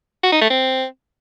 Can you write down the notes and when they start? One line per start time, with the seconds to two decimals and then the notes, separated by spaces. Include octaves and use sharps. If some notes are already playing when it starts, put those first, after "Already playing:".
0.23 F#4
0.32 D#4
0.41 A3
0.50 C4